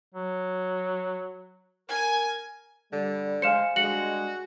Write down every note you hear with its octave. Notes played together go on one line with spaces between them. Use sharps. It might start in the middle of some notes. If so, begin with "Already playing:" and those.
F#3
A#4 G#5
D3 G3
G#3 C5 F5 G#5 C#7 E7
D3 G3 G#3 F#4 C#7 F#7